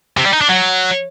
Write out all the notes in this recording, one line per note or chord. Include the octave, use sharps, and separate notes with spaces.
C3
G3
D#4
D4
F#3